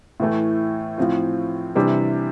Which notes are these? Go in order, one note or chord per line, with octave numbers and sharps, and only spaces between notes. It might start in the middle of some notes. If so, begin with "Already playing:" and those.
A2 E3 A3
A2 F3 C4 F4
C3 E3 G3 D4